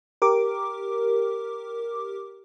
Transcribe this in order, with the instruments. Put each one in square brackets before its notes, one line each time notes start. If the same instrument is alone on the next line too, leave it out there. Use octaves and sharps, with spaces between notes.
[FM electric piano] G4 A#4 D6